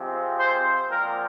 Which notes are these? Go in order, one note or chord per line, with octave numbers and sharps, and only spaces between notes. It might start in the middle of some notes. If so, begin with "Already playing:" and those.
Already playing: C3 F3 G#3 C4
C5
A#2 F3 C4 A#4